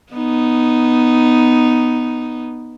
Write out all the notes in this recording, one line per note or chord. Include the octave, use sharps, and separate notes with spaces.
B3 D#4